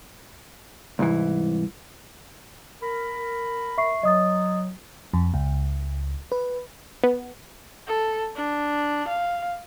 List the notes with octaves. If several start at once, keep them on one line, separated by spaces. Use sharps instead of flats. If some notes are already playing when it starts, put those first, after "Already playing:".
C2 G#2 E3
A#4 B5
E5 C#6 C7
F#3 D#5 D#6 A6
F2
C#2
B4
B3
A4
D4
F5